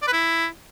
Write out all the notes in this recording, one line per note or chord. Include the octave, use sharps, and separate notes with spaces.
D5
B4
E4